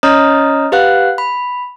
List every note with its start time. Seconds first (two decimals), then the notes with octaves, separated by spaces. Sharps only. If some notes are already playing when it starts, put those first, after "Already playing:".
0.03 C#4 C#5 D#5 A#5 D#6 F6
0.72 G4 B4 F5 F#5 F#6
1.18 B5